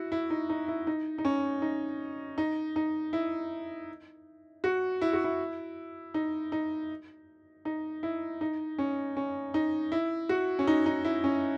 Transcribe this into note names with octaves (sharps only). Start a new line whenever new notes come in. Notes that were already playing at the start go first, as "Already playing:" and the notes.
Already playing: E4 F#4
E4
D#4
D#4
E4
D#4
D#4
C#4
D#4
D#4
D#4
E4
F#4
E4
F#4
E4
D#4
D#4
D#4
E4
D#4
C#4
C#4
D#4
E4
F#4
C#4
D#4
D#4
E4
C#4